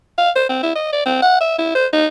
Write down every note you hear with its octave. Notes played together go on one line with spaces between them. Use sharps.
F5
C5
C4
E4
D#5
D5
C4
F#5
E5
E4
C5
D#4